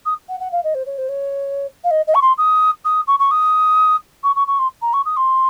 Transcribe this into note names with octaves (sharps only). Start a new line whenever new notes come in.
D#6
F#5
F#5
F5
D#5
C5
C#5
C5
C#5
F5
D#5
D#5
C#6
C6
D#6
D#6
C#6
C#6
D#6
C#6
C#6
C#6
C6
A#5
C#6
D#6
C6